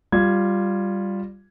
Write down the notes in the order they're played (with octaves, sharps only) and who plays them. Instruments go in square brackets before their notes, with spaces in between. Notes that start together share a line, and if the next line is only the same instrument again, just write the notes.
[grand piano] G3 F4 G#6